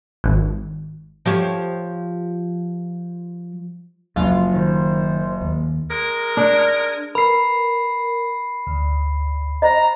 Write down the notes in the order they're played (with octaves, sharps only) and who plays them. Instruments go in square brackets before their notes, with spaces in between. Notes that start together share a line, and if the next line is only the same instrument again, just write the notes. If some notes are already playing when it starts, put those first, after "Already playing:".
[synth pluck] G#1
[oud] F3 G4 C#5
[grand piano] F#1 [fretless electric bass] F3 G#3 D4 [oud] F4
[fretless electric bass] D#3 [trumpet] C5
[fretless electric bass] D#2
[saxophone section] G#3 A#4
[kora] D4
[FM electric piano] A#4 [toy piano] B4 [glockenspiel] B5 C7
[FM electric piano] D2
[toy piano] C5 D#5 [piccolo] A#5